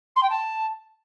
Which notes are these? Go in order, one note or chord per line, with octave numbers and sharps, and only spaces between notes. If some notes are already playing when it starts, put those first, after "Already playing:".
C6
G5
A5